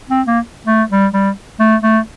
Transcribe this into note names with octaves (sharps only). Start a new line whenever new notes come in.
C4
A#3
A3
G3
G3
A3
A3